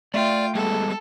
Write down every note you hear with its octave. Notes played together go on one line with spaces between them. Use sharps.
A3 F4 D5 E5 G5
G3 G#3 B3 A4